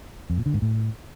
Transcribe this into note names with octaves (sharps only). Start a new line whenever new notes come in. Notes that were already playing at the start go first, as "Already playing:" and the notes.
F2
A#2
D3
G#2
A2